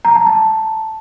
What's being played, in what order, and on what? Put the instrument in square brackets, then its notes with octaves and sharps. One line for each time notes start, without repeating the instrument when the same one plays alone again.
[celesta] A#5
A5
A5